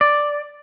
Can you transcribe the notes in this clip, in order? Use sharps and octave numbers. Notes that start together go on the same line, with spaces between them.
D5